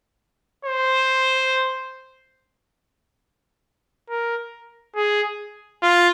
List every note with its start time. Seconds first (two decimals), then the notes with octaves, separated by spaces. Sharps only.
0.65 C5
4.10 A#4
4.96 G#4
5.82 F4